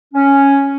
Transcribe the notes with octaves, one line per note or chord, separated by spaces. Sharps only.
C#4